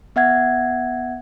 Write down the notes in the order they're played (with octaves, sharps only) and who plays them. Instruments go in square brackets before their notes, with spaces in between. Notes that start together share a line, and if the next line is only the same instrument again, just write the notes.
[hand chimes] B3 E5 F#5 G#6